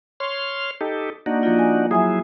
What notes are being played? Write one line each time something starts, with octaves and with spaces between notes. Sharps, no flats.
C#5 C6 F6
D#4 G4 A4
A#3 D4 D#4 F#4
F3 A#3 F4
G#5
F#3 E4 G#4 E5 G#5 D#6